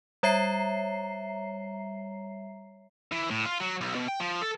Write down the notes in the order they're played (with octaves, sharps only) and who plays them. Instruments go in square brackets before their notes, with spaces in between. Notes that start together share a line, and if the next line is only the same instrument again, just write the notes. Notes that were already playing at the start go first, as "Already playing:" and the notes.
[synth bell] G3 C#5 E5 A#5 C7
[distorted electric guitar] E3
A2
F4
F#3
B1
B2
G5
F3
A4